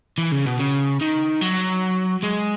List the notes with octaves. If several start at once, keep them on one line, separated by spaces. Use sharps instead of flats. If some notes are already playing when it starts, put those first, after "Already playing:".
E3
C#3
B2
C#3
D#3
F#3
G#3